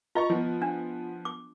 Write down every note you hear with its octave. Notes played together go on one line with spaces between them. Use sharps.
F4 D#5 A#5 C#6
F3 B3
D4
D6